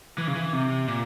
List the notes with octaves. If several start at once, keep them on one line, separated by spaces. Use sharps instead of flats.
E3
C#3
E3
C3
A#2